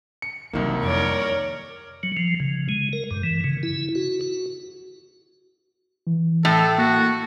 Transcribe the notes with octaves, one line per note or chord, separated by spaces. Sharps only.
C#7
C2 D#3 E3 F#3 A#3
F2 A#4 C#5 D5
F#3
F3
C#3
G#3
A#4
G2
E3
C#3
E4
F#4
F#4
E3
A2 A4
A#3 F#4